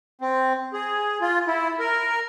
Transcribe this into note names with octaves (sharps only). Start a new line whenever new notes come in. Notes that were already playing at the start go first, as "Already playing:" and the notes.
C4
G#4
F4
E4
A#4